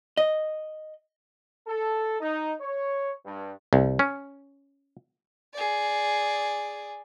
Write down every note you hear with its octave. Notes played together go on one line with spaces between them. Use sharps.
D#5
A4
D#4
C#5
G2
C2
C#4
G#4 D5